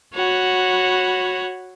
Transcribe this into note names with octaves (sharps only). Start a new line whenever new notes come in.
F#4 C#5 F#5 B5